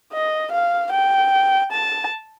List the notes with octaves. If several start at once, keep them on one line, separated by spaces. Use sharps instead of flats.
D#5
F5
G5
A5